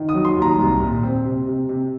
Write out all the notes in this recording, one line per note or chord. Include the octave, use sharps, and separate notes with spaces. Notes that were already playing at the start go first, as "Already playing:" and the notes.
Already playing: D#3
D#6
F#3
C6
D#2
A#5
C2
A#2
C4
C3
C3
C3